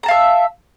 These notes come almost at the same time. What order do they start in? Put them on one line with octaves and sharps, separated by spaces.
A#5 A5 F5 E5